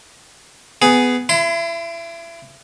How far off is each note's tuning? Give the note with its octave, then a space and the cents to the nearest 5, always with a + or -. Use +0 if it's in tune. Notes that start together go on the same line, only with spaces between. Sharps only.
B3 +15 G#4 +0
E4 +30 C6 -40